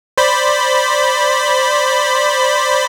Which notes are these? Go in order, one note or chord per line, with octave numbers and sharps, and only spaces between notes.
C5 D5 B5